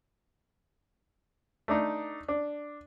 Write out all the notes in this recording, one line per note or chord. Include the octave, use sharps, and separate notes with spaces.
A3 D4 D#4
D4